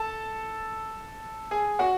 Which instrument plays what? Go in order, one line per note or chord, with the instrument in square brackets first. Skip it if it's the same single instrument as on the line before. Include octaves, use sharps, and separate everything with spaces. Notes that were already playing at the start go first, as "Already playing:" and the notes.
Already playing: [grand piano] A4 A5
G#4 G#5
F#4 F#5